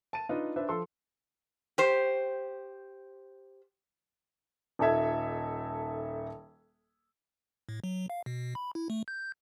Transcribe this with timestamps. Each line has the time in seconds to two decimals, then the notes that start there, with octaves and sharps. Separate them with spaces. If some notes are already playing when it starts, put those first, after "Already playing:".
0.13 A5 D#7
0.29 D4 D#4 F4 B4
0.56 D4 B4 C5 E5
0.69 F3 A4 C6
1.78 G4 C5
4.79 D#1 D#4 A4 E5 G#6
7.69 A2
7.84 F#3
8.10 F5
8.26 B2
8.55 B5
8.75 E4
8.90 A3
9.08 G6